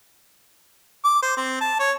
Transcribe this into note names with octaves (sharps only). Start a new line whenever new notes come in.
D6
C5
C4
A5
C#5